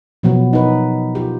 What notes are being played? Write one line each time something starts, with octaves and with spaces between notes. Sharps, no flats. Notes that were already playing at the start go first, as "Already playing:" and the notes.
B2 F3 F#3 B3
D#4 B4
F4 G4